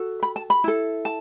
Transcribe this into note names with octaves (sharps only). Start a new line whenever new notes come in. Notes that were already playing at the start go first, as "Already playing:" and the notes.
Already playing: F#4 A4
B5
A5
B5
E4 A4
A5